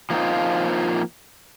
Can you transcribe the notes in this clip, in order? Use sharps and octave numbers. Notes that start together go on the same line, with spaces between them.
F3 A#3 C4 C#4 D#4 F4